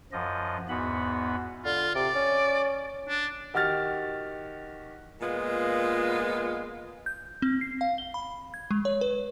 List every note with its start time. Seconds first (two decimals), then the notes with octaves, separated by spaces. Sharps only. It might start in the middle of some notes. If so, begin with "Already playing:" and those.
0.12 F#2 F3 D#5
0.69 E2 G#2 B3 F#4 B5
1.65 D3 F4
1.95 C3 D5
2.15 C#4
3.08 D4
3.54 D#3 F#4 G4 F6 A6
5.21 A#2 G#3 B3 F4
7.06 G6
7.42 C4
7.61 C7
7.81 F5
7.98 G7
8.14 B5
8.54 G#6
8.71 G#3
8.85 C#5
9.01 B4